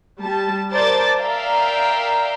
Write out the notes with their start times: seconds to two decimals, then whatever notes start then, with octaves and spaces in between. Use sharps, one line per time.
0.22 G3 A5
0.72 A#4 C5 D5 A5 D6 A6
1.20 A#4 D5 E5 F5 G5